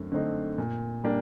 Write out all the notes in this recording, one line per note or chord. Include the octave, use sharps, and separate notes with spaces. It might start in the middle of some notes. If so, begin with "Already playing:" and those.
Already playing: F#2 D3 A3 C4
D3 A3 C4 D#4
A#2
G3 A#3 D4 G4